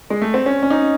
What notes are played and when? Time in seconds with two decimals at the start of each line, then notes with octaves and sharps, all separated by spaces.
0.10 G#3
0.22 A3
0.34 C4
0.46 C#4
0.63 C#4
0.70 D#4